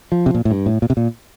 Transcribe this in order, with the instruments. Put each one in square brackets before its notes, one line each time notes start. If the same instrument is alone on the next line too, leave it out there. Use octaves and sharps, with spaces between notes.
[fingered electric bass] F3
C3
A#2
A2
G2
A2
A#2
C3
A#2